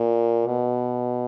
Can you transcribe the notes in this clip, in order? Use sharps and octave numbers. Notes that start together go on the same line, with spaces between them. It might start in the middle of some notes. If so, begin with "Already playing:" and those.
Already playing: A#2
B2